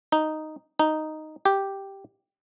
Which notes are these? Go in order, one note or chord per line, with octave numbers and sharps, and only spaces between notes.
D#4
D#4
G4